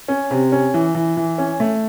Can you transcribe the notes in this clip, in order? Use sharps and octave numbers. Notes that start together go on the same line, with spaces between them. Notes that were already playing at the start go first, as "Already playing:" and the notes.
C#4
C3
C#4
E3
E3
E3
C#4
A3